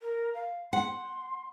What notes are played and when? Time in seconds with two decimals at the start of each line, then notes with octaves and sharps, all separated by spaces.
0.01 A#4
0.34 F5
0.73 F#5 C6